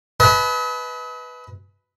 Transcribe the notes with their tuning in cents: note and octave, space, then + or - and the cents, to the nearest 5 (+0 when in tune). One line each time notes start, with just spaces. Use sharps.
B4 +0 D#5 +45 A5 -45